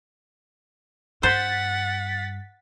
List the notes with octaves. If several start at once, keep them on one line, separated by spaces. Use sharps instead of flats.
G2 C5 F#5 A6 B6